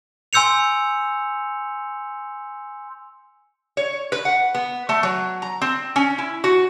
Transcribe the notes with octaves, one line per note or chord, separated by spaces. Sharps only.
G#5 C6 E6 G6 C#7 F7
C#5
B4
F#5
B3
A3
F#3
A#5
C4
C#4
E4
F#4